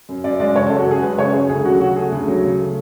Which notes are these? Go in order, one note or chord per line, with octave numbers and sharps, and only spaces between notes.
F#2
F#2 D5
G#3 D5
C#3 C#5
A4
F#2
F#4
F#2 G#4
G#3 B4
C#3 C#5
F#2 G#4
D2 G#4
F#3 F#4
C#3 F#4
A3 G#4
D2
F#3
C#3
A3